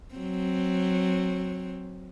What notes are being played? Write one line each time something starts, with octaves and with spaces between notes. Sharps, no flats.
F#3 C4